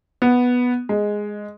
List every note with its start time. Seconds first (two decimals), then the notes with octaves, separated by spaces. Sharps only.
0.22 B3
0.89 G#3